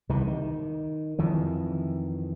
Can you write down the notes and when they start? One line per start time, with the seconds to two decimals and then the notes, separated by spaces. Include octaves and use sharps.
0.09 C2 C3 D#3 E3
0.27 D#3
1.19 F2 D#3 E3